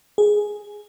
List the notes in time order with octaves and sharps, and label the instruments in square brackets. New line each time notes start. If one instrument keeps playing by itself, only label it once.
[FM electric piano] G#4